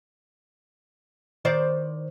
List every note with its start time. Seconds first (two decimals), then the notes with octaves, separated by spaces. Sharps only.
1.45 D#3 C5 D5